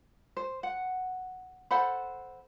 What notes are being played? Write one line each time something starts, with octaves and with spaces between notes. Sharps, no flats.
C5
F#5
A4 C5 F#5 B5